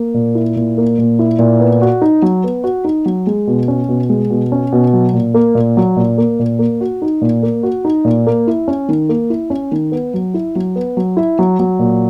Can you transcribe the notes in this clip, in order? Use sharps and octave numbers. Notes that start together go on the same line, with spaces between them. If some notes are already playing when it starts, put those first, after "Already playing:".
Already playing: A#3
A#2
E4
A#2
A#3
A#2
E4
A#2
B3
F#4
D#4
F#3
B3
F#4
D#4
F#3
G#3
B2
C#4
B2
G#3
B2
C#4
B2
F#3
A#2
A#3
A#2
F#3
A#2
A#3
A#2
A#3
F#4
D#4
A#2
A#3
F#4
D#4
A#2
A#3
E4
C#4
D#3
A#3
E4
C#4
D#3
B3
F#3
E4
F#3
B3
F#3
E4
F#3
F#3
A#2